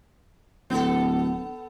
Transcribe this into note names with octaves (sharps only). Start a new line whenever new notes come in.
D1 B3 A4